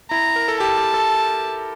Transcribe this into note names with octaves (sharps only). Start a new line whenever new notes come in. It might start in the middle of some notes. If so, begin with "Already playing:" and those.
E4 A#5
A#4
A4
G4 A5
G4
A4